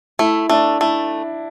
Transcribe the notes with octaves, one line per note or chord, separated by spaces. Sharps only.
A3 E4
A3 D4
A3 E4